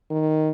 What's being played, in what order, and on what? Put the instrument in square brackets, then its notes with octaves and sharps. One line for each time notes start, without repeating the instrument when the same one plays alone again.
[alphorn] D#3